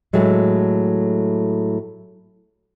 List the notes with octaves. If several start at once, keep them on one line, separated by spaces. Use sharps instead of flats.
A2 F#3 G#3 A3